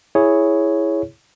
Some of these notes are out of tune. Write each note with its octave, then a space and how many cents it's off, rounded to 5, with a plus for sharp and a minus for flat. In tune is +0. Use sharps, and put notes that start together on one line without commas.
E4 +0 G#4 +0 C#5 +0